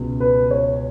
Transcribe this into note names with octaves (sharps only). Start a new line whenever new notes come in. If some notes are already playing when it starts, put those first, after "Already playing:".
Already playing: C#2 B2
B4
C#5